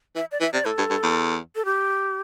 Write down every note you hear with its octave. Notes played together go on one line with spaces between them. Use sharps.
E3 E5
D5
E3 E5
C3 D5
A2 A4
G2
G2
E2
A4
G4